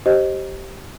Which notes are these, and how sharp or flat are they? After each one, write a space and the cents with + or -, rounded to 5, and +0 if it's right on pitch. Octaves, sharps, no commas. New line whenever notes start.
G4 -20 C5 +20 D#5 +0